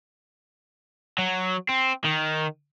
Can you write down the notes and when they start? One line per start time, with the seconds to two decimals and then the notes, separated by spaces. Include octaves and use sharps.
1.18 F#3
1.69 C4
2.04 D#3